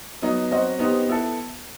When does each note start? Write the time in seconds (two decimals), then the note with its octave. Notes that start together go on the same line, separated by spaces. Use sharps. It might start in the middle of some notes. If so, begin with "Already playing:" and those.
0.22 F#3 B3 D#4
0.51 F#3 C4 F#4 C5 D#5
0.79 B3 D#4 G4 C5
1.07 B3 E4 A4